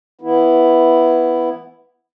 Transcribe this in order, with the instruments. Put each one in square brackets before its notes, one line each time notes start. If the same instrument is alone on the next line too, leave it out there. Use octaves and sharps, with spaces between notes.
[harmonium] E3 B3 E4